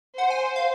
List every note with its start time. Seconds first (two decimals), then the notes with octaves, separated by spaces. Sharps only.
0.18 C5 F#5
0.30 G#5
0.56 F5